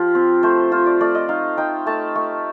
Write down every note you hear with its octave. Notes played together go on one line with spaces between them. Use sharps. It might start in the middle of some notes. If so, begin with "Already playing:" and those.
Already playing: F3 F4 G4
C4
A3 C5
F4 C5
D5
A3 D5
D#5
D#4 F5
D#4 G5
A3 A5
A3